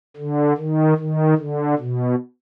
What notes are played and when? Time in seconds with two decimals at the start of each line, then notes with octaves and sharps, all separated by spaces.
0.17 D3
0.57 D#3
0.97 D#3
1.38 D3
1.78 B2